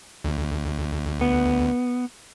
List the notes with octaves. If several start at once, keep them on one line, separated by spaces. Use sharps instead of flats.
D2
B3